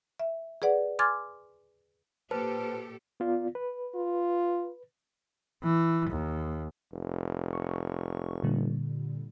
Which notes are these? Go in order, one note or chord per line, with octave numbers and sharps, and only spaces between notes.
E5
G#4 B4 D5 F#5
G#5 C6 D6 F6 G#6 A6
A#2 G4 A4 B4 C5 A5
B3 F4 D5
B4
F4
E3
D#2
F1
C#6
A#2 D3 G3